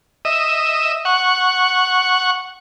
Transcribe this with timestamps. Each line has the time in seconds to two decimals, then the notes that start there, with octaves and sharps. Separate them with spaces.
0.25 D#5 E5
1.05 F#5 C#6